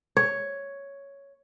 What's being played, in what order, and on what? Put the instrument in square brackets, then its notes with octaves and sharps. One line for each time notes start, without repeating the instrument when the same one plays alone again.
[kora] C#5